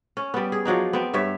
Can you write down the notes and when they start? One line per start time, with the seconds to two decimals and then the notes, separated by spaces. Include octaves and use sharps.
0.17 C#4
0.34 G3 B3
0.52 G#4
0.65 F3 F#3 D4 D#4
0.93 B3 C4
1.13 G2 C#5 E5